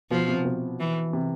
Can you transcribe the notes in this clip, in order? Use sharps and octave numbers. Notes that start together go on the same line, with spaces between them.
B2 F3
C3
B2
E3
C3